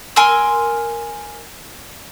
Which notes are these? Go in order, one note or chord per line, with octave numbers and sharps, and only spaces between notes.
A#4 G#5 C6 E6